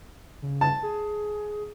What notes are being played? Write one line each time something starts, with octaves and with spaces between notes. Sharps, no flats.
C#3
A5
G#4